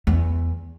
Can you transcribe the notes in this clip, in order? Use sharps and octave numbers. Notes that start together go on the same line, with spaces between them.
E2